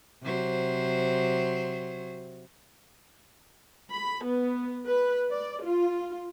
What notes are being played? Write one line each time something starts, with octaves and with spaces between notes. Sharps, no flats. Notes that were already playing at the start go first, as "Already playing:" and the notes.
C3 F#3 C5
B5
B3
B4
D5
F4